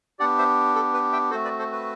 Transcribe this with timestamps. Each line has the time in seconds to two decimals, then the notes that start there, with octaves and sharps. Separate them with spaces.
0.19 B3 D4 G4 D5 F#5
0.38 C5 E5
0.75 A4
0.94 B4
1.13 E5 G5
1.31 A3 C4 F#4 A4 C5
1.44 B4 D5
1.59 A4 C5
1.72 B4